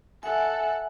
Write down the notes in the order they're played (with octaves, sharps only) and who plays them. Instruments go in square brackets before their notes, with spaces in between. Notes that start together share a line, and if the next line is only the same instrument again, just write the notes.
[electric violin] A4 F#5 [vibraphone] E5 G#5